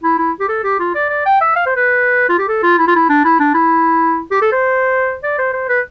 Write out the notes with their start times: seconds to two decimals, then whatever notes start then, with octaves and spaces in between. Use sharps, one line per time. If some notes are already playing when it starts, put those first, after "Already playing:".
0.03 E4
0.18 E4
0.40 G4
0.49 A4
0.64 G4
0.80 F4
0.95 D5
1.10 D5
1.26 G5
1.41 E5
1.56 F5
1.66 C5
1.76 B4
2.29 F4
2.39 G4
2.48 A4
2.63 F4
2.78 E4
2.87 F4
2.96 E4
3.09 D4
3.25 E4
3.40 D4
3.54 E4
4.31 G4
4.42 A4
4.52 C5
5.23 D5
5.39 C5
5.54 C5
5.69 B4